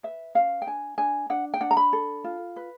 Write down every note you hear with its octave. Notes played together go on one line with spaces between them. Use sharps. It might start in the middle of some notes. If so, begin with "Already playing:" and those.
B4 E5
C#4 F5
G5
D4 G#5
D4 G#5
D4 F#5
G5
D4 F#5
A#5
B5
A4
F4
B4